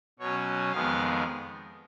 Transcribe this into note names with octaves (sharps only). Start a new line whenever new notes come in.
B2 F#3 C#4 C#5
F2 D#3 G#3 B3 F5